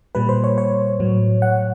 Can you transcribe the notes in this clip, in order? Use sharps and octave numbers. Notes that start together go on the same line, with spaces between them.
A#2 G3 B4
C5
C#5
C#5
A2 F#3
F#5